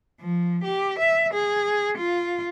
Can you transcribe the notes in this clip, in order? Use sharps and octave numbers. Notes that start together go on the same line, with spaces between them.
F3
G4
E5
G#4
F4